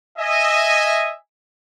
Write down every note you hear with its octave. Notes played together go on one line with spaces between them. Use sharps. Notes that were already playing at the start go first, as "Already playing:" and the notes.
D#5 E5 G#5